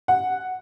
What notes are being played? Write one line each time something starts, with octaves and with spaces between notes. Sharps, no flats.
F#5